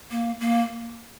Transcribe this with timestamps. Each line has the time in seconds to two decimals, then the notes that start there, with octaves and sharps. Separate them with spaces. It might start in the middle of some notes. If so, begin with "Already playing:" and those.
0.11 A#3
0.40 A#3